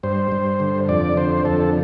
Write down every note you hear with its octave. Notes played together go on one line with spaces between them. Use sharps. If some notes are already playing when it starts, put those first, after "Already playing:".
G2 C5
G2
D3
F2 D5
D3 C5
F2 A4